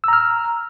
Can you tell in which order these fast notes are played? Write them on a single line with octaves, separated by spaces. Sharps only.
E6 A#5 F6